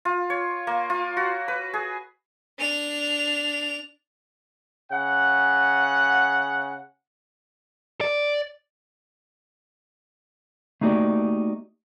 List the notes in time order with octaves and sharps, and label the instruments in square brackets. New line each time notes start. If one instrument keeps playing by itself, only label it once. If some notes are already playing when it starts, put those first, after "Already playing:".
[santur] F4
C#5
A#3
F4
F#4
B4
G#4
[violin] D4 F7
[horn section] C#3 F#5
[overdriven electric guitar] D5
[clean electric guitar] A3 A#3 D#4 F#4 G4 D5